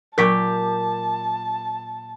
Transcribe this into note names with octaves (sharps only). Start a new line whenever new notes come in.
A#2 F#3 G4 A#4 A5 C#6 D6 B6